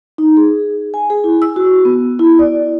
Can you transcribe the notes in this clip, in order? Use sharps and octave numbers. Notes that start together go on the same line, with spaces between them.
D#4
G#4
G#5
G#4
E4
E6
F#4
B3
E4
D5